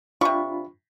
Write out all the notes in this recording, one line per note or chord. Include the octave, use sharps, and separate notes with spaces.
C3 D4 F4 B5 C#6